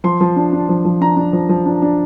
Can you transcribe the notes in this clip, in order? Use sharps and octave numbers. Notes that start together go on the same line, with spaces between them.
F3 C6
F3
D4
D4
F3
F3
D4 A#5
D4
F3
F3
D4
D4